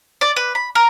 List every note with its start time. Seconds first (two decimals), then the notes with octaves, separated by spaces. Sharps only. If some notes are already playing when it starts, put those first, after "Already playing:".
0.21 D5
0.36 B4
0.55 B5
0.75 A#4